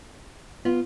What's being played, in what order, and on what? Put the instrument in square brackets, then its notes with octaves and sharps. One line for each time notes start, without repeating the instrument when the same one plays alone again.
[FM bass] B3 [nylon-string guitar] F4